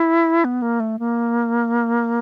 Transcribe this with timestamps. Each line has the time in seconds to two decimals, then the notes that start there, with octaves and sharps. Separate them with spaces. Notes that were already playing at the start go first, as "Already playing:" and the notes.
Already playing: E4
0.45 B3
0.62 A#3
0.80 A3
0.99 A#3